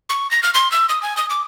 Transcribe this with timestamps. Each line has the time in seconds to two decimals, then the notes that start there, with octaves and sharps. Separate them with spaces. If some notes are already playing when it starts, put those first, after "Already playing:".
0.09 C#6
0.31 A#6
0.43 F6
0.54 C6
0.72 E6
0.89 D#6
1.03 G#5
1.17 D#6
1.30 D6